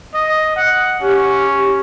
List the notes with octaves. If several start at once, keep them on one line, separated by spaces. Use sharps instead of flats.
D#5
F#5
C#4 G4